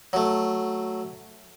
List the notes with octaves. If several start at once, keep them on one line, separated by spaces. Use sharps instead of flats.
F#3 A3